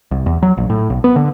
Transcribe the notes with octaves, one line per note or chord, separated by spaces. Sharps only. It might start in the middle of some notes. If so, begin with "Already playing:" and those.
C2
E2
F#3
A#1
A2
B1
B3
D3